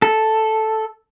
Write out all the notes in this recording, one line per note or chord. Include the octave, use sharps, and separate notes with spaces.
A4